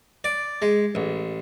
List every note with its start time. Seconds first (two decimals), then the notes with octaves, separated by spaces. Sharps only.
0.24 D5
0.62 G#3
0.95 A1